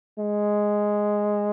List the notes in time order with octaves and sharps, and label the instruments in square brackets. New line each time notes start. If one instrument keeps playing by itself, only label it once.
[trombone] G#3